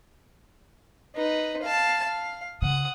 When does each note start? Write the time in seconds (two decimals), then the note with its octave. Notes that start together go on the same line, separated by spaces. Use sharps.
1.15 D#4 B4
1.62 F5 A5
2.04 F5
2.62 C#3 F#5 D#6